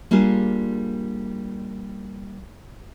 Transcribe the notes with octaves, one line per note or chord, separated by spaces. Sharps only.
G3 A#3 D4 F4 G#4